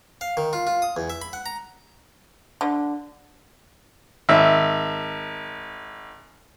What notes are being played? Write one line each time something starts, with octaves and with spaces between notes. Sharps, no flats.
F5
D#3
F4
F4
D#6
E2
E5
B5
F#5
A#5
D3
G#1 E5